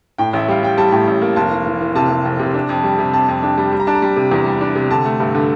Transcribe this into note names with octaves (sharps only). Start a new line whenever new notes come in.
A2 G5
A1 E5
G3 F5
G3 G5
G3 A5
A2
A1
A#3
F1 A5
E3
E3
E3
C3 A5
C3
F1
C3
D4
F2
G3
C3
F2 A5
F2
D4
G3
G3
A#5
D4 A5
A#5
G3
C3
E2
G3
D4
C3
D3 A5
A3
G2
D3